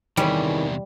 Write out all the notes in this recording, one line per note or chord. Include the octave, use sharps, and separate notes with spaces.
E2 C3 D#3 E3 G3 G#4 C#5